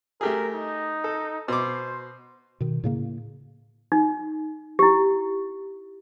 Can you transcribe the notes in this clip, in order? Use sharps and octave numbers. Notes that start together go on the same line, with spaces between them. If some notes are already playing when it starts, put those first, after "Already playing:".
A3 G4 G#4 A#4
D#4
A4
B2 C5 D6
B2 D#3
A2 C#3 A#3
D#4
E4 G4